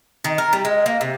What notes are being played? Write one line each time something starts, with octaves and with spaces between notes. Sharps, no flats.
D#3
A#4
G3
G#3
A#3
C3